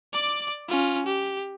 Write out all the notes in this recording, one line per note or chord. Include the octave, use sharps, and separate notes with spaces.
D5 D6
C#4 F4
G4